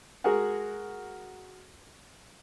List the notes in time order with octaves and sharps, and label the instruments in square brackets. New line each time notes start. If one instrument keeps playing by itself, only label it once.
[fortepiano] G#3 F#4 G#4 A#4 F#5